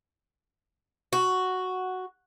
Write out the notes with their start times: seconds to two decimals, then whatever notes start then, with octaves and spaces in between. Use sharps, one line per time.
1.13 F#4